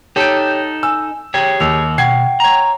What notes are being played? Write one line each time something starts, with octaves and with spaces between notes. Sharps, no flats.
D#4 G4 A4 C#5 G6 D7
G#5 E6
G4 G#4 C#5 G5
D#2 E6 F7
B2 F#5 G5 G#6 C7
C#5 A#5